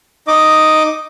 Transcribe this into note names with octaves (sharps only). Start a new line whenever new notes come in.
D#4 D#5 D6